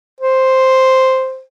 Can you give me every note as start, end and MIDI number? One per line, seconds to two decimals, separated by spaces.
0.20 1.42 72